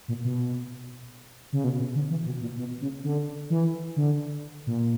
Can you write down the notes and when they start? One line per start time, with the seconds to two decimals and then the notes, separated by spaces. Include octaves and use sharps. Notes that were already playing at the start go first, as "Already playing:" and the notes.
0.08 A#2
0.24 B2
1.53 C#3
1.64 B2
1.80 B2
1.95 D3
2.10 E3
2.26 B2
2.41 A#2
2.57 B2
2.81 C#3
3.04 D3
3.50 E3
3.96 D3
4.67 A#2